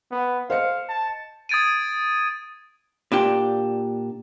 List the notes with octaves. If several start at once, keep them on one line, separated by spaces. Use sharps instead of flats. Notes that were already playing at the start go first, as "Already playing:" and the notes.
B3
C5 D#5 F5 C#7
A5
D#6 G#6 A6 D7 D#7
A#2 D4 G4